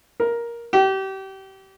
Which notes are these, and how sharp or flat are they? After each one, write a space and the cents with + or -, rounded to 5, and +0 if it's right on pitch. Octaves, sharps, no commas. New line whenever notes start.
A#4 +10
G4 -30